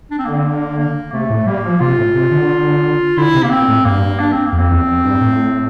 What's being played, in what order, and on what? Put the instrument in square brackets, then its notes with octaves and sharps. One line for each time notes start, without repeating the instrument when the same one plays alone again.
[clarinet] D4
C4
[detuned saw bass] D3 [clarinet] A#3
[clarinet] C4
A#3
A#3
[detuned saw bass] C3 [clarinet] A3
[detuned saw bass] A2
[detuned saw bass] G3 [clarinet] A#3
[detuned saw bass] F3
[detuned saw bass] C3 [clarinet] F4
[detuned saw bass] A2
C3
D3
[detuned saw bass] D3 [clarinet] E4
[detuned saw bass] C3
[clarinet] A#3
[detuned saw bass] A#2 [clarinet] C4
[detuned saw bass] A2
[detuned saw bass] G2 [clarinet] A#3
[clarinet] D4
C4
A#3
[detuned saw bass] F2
[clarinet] C4
[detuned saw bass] E2
F2
G2
A2